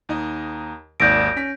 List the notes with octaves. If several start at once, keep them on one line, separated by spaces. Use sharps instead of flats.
D#2 D#4 D#5
G#1 D#2 D5 G6 A#6 D7
C#4 B6